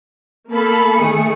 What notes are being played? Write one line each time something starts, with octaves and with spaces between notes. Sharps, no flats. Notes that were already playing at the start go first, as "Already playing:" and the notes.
A#3 A4 B5
D#3 A3 G#4 C#7